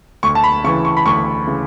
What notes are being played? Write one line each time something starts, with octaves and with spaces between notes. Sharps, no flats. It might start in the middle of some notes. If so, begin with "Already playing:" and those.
D2 C#6
A5
B5
C#3 E3 C#6
C#6
B5
D2 C#6
C#3 E3